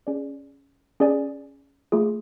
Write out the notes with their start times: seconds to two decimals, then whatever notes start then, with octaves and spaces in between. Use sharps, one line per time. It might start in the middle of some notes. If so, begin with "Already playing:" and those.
0.07 C#4 G#4 D5
1.00 C#4 G#4 D5 G#5
1.92 A3 F4 G#4